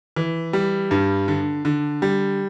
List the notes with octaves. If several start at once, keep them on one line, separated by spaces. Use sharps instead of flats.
E3
G3
G2
D3
D3
G3